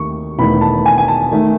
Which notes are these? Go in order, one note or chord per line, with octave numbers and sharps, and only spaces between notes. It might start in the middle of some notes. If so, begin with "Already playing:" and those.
Already playing: D#2 D#3 A3 D#4 C#6
E1 E2 D#3 A3 B5
A5
G#5
G#5
A5
D#3 A3